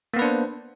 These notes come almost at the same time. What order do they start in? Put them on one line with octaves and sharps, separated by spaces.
A#3 B3 B4 D4 C5